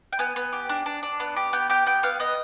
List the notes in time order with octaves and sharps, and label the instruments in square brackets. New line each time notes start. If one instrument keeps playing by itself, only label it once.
[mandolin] G5
B3 G#5
B3
G4
D4
D4
D4
B3
G4
B3 G5
G4 G5
B3 G5
B3 F5
B3 D#5